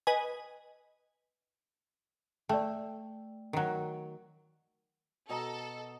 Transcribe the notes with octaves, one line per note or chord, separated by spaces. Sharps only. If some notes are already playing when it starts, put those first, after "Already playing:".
B4 D#5 G#5
A3 D5 G5
D#3 F#3
B2 A4 D#5 A#5